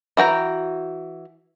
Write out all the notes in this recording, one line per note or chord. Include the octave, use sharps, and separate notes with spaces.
E3 F#4 G5 A#5